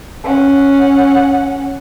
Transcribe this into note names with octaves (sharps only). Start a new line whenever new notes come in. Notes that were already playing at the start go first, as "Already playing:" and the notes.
C#4 F#5